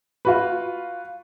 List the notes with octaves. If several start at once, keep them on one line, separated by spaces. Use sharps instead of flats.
F4 F#4 B4